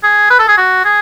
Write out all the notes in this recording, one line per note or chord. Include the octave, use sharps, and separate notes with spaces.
G#4
B4
A4
G#4
F#4
G#4